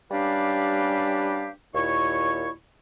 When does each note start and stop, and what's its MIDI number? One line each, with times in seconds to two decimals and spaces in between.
0.11 1.50 55
0.11 1.50 61
0.11 1.50 62
0.11 1.50 67
0.11 1.50 71
0.11 1.50 77
1.74 2.50 39
1.74 2.50 46
1.74 2.50 64
1.74 2.50 73
1.74 2.50 85